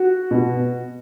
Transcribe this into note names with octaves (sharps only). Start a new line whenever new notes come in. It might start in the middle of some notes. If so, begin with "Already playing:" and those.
Already playing: F#4
B2